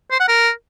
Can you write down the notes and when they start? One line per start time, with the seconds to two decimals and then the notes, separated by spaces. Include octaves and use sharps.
0.11 C5
0.20 F#5
0.28 A#4